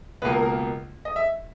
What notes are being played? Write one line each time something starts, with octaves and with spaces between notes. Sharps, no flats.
C#2 B2 A#3 B4
A#4
A#4
D#5
E5